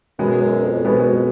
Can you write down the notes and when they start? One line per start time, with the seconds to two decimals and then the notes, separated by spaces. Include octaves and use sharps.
0.19 F#2 B2 G#3 B3
0.41 F#2
0.63 F2
0.85 G2 B2 G#3 B3
0.95 F#2
1.06 F2